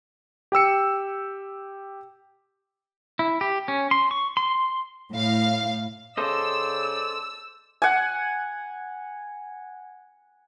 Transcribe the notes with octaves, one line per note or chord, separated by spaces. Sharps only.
G4 G5 E6 C#7
E4
G4
C#4
C6
C#6
C6
A2 F5
C#3 A4 C5 D5 D#5 E6
F#5 G#5